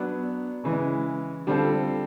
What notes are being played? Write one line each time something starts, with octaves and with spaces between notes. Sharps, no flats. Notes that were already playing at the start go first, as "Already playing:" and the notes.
Already playing: F#3 B3 D4
C#3 E3 G#3
D3 G3 C4 F4 A4